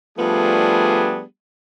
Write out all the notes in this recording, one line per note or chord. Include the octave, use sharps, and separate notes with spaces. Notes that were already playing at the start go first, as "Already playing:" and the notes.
F3 G3 A3 B3 D4 G#4